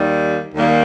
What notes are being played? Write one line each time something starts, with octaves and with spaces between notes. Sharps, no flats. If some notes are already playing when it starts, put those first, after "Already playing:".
Already playing: D#2 D#3 G3 A#3
D#2 D#3 G3 A#3